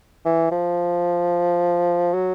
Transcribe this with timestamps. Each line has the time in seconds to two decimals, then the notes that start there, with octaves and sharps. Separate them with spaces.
0.25 E3
0.52 F3
2.14 F#3